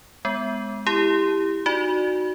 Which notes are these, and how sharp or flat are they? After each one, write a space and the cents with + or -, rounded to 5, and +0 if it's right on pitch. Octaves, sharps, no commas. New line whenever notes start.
G#3 +0 B3 +25
E4 +0 G4 +15
D#4 +0 F#4 -5 D5 +15